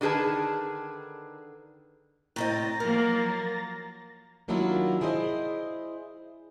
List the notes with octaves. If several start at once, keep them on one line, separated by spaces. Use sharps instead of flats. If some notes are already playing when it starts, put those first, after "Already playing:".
D3 D#3 G#4 B4 A5
A2 C4 D#5 A#5 A6 A#6
F3 F#3 A#3 A#4
D#3 F#3 A#3 D4 E4 F4
E4 G#4 C5 D5 D#5